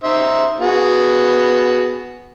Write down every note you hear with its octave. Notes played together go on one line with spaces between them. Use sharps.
D#4 C5 E5
B3 F#4 G#4